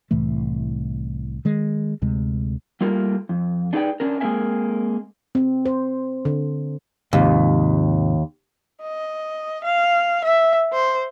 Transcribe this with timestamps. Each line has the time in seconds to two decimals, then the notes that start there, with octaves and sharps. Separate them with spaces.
0.11 C2 A2 E3 A3
1.45 D#3 G#3
2.02 D2 C3 G#3
2.81 G3 A3 A#3 F4 A#4
3.29 F2
3.73 D4 D#4 G#4 B4 D5 G5
4.00 C#4 D4 A#4
4.20 G#3 A#3 C4 A#4 E5 G#5
5.35 C4
5.65 C5
6.25 D3
7.13 D#2 G#2 C3 F3
8.82 D#5
9.64 F5
10.24 E5
10.73 C5